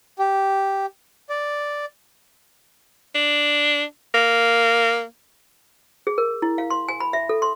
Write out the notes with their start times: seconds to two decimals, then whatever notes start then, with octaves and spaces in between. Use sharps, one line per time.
0.19 G4
1.29 D5
3.15 D4
4.14 A#3
6.07 G#4
6.18 A#4
6.42 E4
6.58 F5
6.70 C6
6.88 G#5
7.00 B5
7.13 E5
7.29 A4
7.42 C6